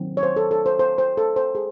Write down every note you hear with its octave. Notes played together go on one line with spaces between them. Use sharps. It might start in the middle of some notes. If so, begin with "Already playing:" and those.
Already playing: D#3 F#3 C4
C#5
C5
A4
A4
C5
C5
C5
A4
C5
G#4